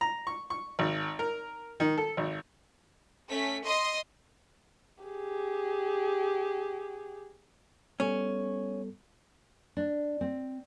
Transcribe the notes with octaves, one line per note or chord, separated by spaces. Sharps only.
A#5
C#6
C#6
G#1
A#4
D#3
A4
G#1
A3 C#4 B6
D#5 C6 D#6
G4 G#4
G3 B3 C#4 A4
D4
C4